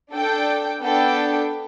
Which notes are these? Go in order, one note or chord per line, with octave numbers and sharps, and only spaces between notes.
D4 A4 G5
B3 D4 A4 G5